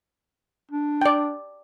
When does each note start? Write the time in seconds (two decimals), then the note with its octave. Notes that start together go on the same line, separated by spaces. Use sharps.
0.71 D4
1.01 D5 G5